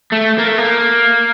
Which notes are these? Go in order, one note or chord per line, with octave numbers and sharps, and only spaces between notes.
A3
A#3
A3
A#3